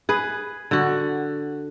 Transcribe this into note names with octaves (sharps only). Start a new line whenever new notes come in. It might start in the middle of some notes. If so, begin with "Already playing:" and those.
G#4 B4
D3 F#4